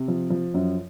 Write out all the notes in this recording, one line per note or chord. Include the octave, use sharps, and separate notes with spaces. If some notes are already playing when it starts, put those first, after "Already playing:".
Already playing: C3
F3
F3
F#2